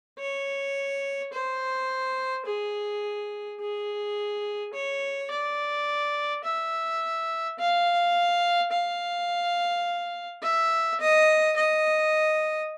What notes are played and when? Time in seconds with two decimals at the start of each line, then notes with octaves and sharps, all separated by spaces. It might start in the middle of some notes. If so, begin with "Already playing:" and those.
0.19 C#5
1.33 C5
2.46 G#4
3.61 G#4
4.74 C#5
5.31 D5
6.45 E5
7.59 F5
8.72 F5
10.42 E5
11.01 D#5
11.57 D#5